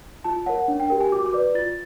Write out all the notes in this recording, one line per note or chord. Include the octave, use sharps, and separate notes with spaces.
F4 A5
A#4 C#5 F#5
D4
G5
G4 A#4 G5
G#5
F#4 D6
D6
B4 D5
F4 A6